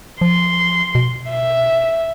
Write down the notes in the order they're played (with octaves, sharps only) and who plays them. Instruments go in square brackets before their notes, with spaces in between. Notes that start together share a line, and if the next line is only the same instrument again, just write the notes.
[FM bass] F3 [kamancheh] C6
[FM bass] B2
[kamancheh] E5